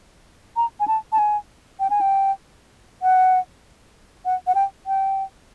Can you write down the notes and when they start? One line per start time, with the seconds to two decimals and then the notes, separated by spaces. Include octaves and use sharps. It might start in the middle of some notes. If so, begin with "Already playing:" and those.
0.57 A#5
0.80 G#5
0.88 A5
1.12 A5
1.18 G#5
1.80 G5
1.90 G#5
2.01 G5
3.02 F#5
4.25 F#5
4.47 F#5
4.55 G5
4.86 G5